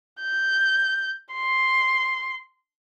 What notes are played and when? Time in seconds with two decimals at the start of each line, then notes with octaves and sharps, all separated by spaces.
0.21 G6
1.34 C6